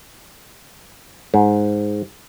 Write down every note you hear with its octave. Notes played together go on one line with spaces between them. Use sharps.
G#2